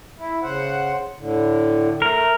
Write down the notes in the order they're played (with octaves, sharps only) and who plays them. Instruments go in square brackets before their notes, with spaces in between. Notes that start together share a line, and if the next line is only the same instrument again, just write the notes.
[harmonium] E4
C#3 C5 F#5
A2 D3
[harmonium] A3 [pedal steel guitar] A#4